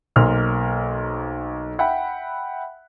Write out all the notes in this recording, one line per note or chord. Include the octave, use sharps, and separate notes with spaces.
B1 A#3 C5 C6 F6
E5 F#5 G5 B5